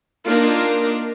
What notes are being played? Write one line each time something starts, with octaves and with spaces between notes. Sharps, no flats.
A#3 D4 D#4 F4 A#4